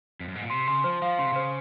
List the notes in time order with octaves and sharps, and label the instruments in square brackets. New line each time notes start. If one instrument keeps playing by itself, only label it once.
[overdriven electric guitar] F2
F#2
G#2
A#2
[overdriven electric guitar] C3 [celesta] C6
[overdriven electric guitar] C#3 [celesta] C6
[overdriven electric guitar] F3 [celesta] C5
[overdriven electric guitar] F3 [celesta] F5
[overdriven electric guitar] C#3 [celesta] C6
[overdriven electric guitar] C3
[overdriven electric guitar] C#3 [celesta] C5